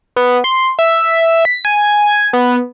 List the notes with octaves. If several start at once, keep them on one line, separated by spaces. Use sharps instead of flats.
B3
C6
E5
B6
G#5
B3